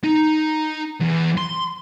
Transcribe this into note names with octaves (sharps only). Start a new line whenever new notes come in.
D#4
E2
C6